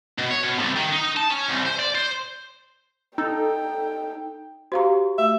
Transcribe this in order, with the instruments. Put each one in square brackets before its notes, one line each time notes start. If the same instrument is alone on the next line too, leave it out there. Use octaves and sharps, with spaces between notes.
[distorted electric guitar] B2
C#5
B2
C2
D#3
D#4
A5
C#4
C2
C5
D5
C5
[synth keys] D#4 A4 [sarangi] G5
[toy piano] F#4 G4 [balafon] C5 F5 A#5
[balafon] A3 [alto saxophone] E5